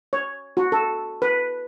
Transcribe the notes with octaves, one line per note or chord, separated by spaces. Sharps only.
C#5
F#4
A4
B4